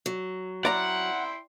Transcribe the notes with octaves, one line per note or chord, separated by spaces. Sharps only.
F#3
E4 D5 F#5 G5 A#5 C6